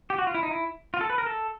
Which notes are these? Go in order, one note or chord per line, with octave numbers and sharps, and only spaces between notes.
G4
F#4
F4
E4
D#4
E4
F4
A4
B4
A#4
A4